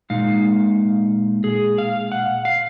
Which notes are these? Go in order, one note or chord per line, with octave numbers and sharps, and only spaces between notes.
A#2 G#3 D#4 F5
G#4
F5
F#5
F5